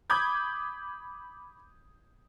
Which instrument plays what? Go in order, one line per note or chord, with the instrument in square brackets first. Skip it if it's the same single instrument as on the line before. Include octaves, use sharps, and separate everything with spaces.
[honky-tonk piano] B5 D6 D#6 G6 G#6